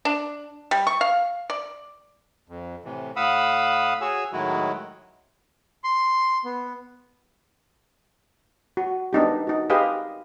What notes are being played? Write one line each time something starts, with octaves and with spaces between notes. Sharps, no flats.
D4
G3
C#6
F5
D5
F2
A2 C3 E3
A2 F5 F#5 B5 D#6 E6
F#4 G#4 C#5 G#5 E6
A2 D#3 F#3 G#3 E4 F#4
C6
B3
F#4
B3 D4 D#4 G4
D#4 F#4
G4 G#4 B4 D#5 F5